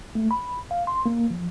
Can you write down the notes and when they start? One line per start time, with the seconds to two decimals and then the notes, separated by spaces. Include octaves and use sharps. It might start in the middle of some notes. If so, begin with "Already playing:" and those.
0.15 A3
0.31 B5
0.71 F5
0.87 C6
1.06 A#3
1.31 F3